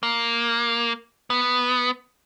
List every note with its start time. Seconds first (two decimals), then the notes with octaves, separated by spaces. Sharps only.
0.03 A#3
1.30 B3